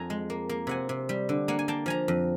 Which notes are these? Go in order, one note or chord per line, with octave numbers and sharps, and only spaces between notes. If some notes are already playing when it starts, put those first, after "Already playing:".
Already playing: F2 G#5 A#5
G#3
A#3
A#3
C3 F#5 G#5
C3
G3
D3
A#3 F#5 G#5
G#5
A#3 G5 A5
F3 G#5 A#5
F2